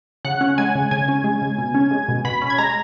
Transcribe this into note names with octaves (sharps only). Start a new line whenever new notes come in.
C#3 F#5 F#6
C#4
G#3 G#5 G#6
C#3
C#3 G#5 G#6
C#4
G#3
C#3
B2
C#4
G#3
B2
B2 B5 B6
C#4
G#6
G#3 A#5 A#6